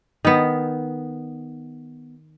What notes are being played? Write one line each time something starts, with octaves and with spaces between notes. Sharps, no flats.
D#3 B3